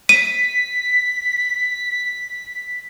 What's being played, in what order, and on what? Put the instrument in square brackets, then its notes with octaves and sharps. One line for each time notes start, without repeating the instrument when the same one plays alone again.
[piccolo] B6 [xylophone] D#7